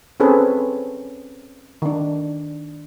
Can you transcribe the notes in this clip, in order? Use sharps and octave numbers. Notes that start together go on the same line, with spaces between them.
C4 C#4 G#4 A4 B4
D#3 D4